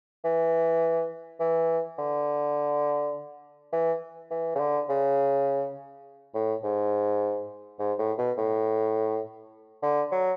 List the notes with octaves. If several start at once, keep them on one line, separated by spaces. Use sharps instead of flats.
E3
E3
D3
E3
E3
C#3
D3
C#3
A2
G#2
G#2
A2
B2
A2
D3
F#3